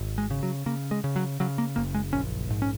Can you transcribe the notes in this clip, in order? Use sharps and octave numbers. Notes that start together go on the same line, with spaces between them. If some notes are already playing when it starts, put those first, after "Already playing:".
Already playing: G#1
G#3
C#3
F#3
C#3 A#3
G#3
C#3
F#3
C#3 F#3
A#3
F#1 A#3
G#3
A#1 C#4
G#2
C#4